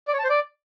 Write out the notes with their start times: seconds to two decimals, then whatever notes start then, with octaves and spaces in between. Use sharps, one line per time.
0.08 D5
0.13 C#5
0.19 A5
0.24 C5
0.30 D5